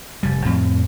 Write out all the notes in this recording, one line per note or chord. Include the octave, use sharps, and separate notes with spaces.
F1 G3
F2 A2 F3 C4